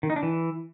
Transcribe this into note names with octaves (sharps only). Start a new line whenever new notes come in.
D#3
D#4
D4
E3